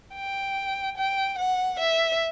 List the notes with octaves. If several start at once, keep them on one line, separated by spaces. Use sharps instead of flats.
G5
G5
F#5
E5